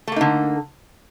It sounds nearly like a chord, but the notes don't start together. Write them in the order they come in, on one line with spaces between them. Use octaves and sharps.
A3 A#3 D#4 D3